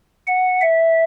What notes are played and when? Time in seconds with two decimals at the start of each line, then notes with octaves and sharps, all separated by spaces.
0.27 F#5
0.61 E5